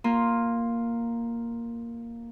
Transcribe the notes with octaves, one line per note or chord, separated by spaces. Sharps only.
A#3 F4